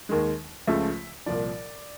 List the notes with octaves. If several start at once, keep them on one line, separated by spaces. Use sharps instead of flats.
D#2 D#3 G#3
C#2 C#3 F3 A3 E5
C2 A#2 F3 D5